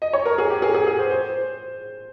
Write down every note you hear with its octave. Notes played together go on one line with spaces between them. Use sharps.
D#5
C#5
A#4
G#4
G4
G#4
G#4
G#4
C5
C5